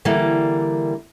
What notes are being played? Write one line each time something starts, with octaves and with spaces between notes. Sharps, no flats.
D3 E3 G3 A#3